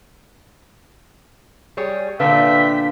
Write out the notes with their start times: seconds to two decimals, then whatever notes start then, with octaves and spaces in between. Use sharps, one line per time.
1.77 G3 G#4 C#5
2.20 A#2 D3 B4 E5 F5 G5 B6